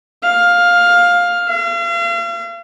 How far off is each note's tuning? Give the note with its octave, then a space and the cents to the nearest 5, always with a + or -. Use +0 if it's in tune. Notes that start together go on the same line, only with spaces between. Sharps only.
F5 +10
F5 -40